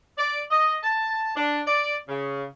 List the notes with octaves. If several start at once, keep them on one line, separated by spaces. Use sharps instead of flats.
D5
D#5
A5
D4
D5
C#3